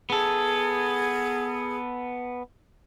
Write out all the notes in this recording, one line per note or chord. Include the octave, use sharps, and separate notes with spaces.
B3 G#4 A4